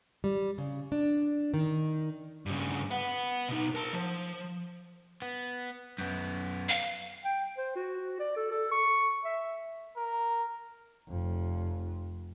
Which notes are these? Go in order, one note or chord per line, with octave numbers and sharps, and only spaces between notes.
G3
C#3
D4
D#3
G2 C#3
B4 F#5
B2 D#4
A#4 A5
F3
B3
F#2 B3
F5
G5
C5
F#4
D5
A4
A4
C#6
E5
A#4
F1 F2